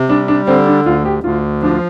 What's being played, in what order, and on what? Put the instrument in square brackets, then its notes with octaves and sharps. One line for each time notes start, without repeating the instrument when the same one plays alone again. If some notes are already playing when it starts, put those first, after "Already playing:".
Already playing: [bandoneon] C3
[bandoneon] G3 [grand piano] D4
[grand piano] D4
[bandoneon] D3 [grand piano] C4
[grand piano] D4
[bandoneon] D2 [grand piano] F4
[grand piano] G4
[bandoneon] D2 [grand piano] F4
[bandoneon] F3 [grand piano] D4
[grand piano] F4